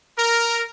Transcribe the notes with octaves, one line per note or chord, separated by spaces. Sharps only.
A#4